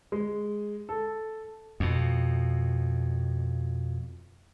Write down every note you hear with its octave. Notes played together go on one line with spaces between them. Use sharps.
G#3
A4
F2 B2